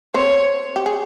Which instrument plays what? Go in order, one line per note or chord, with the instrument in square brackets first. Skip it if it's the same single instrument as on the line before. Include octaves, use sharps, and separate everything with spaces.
[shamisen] C4 C5 [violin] C#5
[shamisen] G4
G#4